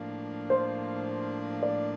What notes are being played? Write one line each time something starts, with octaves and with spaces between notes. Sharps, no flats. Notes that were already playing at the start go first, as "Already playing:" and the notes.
Already playing: A2 F3 A#3 D4
C5
D5